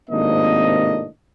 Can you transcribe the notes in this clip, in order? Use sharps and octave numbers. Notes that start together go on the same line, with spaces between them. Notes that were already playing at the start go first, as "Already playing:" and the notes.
G#1 A2 C3 A#3 D4 D#5